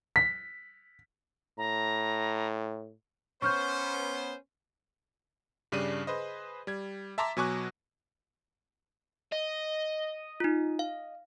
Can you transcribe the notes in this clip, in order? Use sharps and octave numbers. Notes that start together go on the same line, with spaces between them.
B6
A2 A#5
B3 C#4 C5 C#6 F6 G6
G2 C#3 G3 D4 D#7
G#4 B4 C5 D#5
G3 G#6
E5 A5 A#5 C6 D6 B6
B2 F#3 G#5 C#6 D6 F#6
D#5
D#4 F4
F5